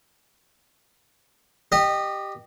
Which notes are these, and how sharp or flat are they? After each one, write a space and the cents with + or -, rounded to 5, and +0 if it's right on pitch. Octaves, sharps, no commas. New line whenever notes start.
G4 +0 D#5 -25